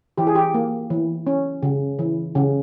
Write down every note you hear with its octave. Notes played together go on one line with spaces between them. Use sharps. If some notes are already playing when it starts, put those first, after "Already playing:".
E3 G4
G#4
G4
A#3
E3
C#4
C#3
E3
C#3